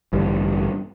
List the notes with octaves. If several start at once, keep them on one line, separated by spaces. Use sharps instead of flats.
A1 G2 D3